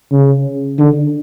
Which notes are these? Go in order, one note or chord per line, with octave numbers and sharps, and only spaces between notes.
C#3
D3